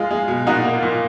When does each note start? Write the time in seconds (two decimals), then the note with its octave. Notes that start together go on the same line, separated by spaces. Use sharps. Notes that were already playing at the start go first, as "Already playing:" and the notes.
Already playing: G#3 F4
0.11 G#3
0.28 B2
0.47 A#2 D#4 F#4
0.65 A#3
0.75 F4
0.83 A#2